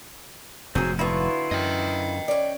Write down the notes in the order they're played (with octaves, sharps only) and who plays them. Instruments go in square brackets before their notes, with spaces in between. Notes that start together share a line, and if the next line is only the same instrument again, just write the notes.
[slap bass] F1 G#2 [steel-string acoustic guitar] F#3 F#4 [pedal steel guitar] C4 G#4
[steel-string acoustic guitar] D3 F#3 B3 [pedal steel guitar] E4 F4 C#6
[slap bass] F#2 [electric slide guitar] D#5 G5
[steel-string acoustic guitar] C#4 D5